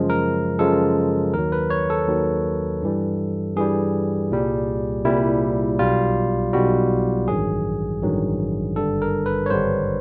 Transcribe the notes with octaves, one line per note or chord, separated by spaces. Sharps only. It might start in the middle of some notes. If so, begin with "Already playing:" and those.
Already playing: F#2 C#3 F3 G#3
A#4
F#2 C#3 F3 G#3 A4
D#2 D#3 F#3 A#4
B4
C#5
A4
D#2 D#3 F#3
G2 E3 G3
G2 E3 G3 G#4
C2 A#2 G3
C2 A#2 G3 E4
B1 B2 G3 F4
B1 B2 G3 F#4
A1 G2 D#3 F#3 G#4
A1 G2 D#3 F#3
G#1 G2 D3 G3 A4
A#4
B4
C#5
G#1 G2 D3 G3 C5